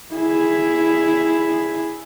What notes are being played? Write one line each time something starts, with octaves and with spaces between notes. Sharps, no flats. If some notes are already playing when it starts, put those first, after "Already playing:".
E4 G#4